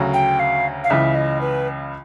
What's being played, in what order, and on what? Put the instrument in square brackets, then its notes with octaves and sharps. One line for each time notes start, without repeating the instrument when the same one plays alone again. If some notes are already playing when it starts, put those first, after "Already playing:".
Already playing: [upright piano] D2 C#3 F#3
[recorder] G5
F5
F5
[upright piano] C#2 C#3 E3 [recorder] E5
[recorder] D#5
B4